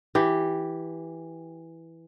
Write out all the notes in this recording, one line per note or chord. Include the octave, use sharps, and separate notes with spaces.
E3 G4